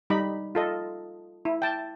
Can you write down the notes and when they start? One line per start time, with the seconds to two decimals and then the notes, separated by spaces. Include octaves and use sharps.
0.10 G3 D#4 B5
0.55 F4 A4 D#5
1.45 E4
1.62 G5 A5